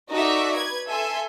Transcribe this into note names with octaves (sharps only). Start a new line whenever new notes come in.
D#4 F#4 A4 D5 E5
B4 G#6
A4 E5 G#5 C6